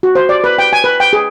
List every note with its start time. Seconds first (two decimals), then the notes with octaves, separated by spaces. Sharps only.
0.03 F#4
0.15 C5
0.29 D5
0.44 B4
0.58 G5
0.73 G#5
0.84 B4
1.00 G5
1.13 G#4